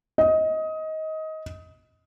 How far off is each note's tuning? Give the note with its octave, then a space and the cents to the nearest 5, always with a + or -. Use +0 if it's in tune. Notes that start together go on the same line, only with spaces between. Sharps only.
D#5 +20